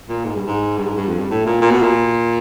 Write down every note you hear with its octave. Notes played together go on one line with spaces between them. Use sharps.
A#2
G#2
G2
G#2
G2
G#2
G2
F2
G2
A2
A#2
A#2
B2
A#2